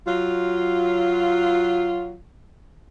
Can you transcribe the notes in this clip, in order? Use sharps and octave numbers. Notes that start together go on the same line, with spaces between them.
F#3 F4